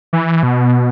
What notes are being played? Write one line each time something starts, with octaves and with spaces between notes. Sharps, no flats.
E3
B2